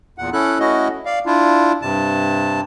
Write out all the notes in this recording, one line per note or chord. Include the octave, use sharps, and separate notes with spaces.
E2 A#2 F#5
C#4 E4 A4 F#6
A3 C#4 E4 F#4 D#5
D5 F5
D4 E4 F4
G2 C3 A5